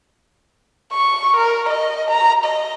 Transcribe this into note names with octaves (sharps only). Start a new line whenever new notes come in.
C#6
A#4
D#5
A#5
D#5